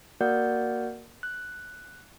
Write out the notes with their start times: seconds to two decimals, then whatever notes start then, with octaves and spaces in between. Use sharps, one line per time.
0.21 A#3 F#4 A#4 D5 F#5 G6
1.23 F#6